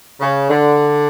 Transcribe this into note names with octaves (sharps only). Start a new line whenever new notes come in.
C#3
D3